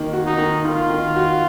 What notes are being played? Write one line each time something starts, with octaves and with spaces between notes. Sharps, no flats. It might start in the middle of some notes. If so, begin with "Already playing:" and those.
Already playing: D#3 A#3
F#4
D#4
D#3
D#3 F4
D#3
F#4